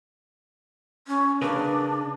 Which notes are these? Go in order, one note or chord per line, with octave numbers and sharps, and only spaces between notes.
C#4
C#3 D4 A#4 B4